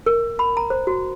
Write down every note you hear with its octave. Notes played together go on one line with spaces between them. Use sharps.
A#4
B5
A#5
C5
F#4